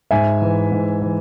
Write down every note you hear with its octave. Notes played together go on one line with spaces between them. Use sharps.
G#2 E5 G#5
E3
G#2
E3